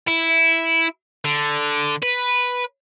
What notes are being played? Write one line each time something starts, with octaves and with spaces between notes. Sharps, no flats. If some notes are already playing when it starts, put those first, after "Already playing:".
E4
D3
B4